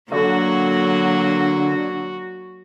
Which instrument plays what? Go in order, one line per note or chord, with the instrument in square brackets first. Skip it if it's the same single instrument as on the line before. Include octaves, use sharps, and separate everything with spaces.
[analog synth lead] D3 [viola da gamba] F#3 A#3 [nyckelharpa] F#4